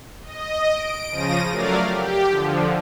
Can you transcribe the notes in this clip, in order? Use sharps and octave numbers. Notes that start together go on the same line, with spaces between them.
D#5
D7
C#3 F3 A#6 D#7
F#3 A3 A#4 D5 F5
G4
D3 F3